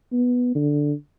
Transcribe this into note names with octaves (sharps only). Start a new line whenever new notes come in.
B3
D3